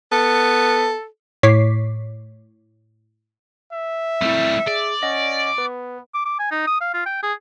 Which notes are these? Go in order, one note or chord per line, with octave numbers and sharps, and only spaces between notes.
B3 A4
A2 C#5 C#6 D6 B6 C7
E5
G3 A3 C4 E4
G#4 D5
C#4 D#5 F#5 A#6
B3 B4
D6
D6
G#5
D#4
D#6
F5
F4
G5
G#4